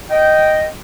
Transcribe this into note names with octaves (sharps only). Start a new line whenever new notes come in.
D#5 G5